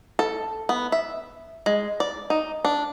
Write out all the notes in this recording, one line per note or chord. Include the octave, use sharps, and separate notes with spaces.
A4
B3
E5
G#3
D5
D#4
D4